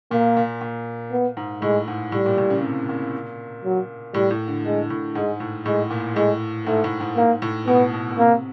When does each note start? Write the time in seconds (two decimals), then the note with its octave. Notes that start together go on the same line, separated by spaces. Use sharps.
0.11 A#2 A#3
0.37 A#2
0.61 A#2
1.12 B3
1.37 G#2
1.62 A2 G#3
1.88 G#2
2.12 A2 G3
2.26 A#2
2.38 A2
2.50 C#3
2.63 C3
2.89 A#2
3.64 F#3
4.14 A2 G3
4.31 A2
4.48 D3
4.65 D3 G#3
4.90 A2
5.15 G#2 G#3
5.40 A2
5.66 A2 G#3
5.90 A#2
6.16 A2 G#3
6.67 G#2 A3
6.84 A2
7.00 G#2
7.17 G#2 A#3
7.42 A2
7.67 B2 B3
7.93 B2
8.11 B2
8.17 C3 A#3